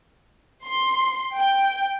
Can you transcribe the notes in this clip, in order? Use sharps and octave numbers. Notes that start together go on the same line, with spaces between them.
C6
G5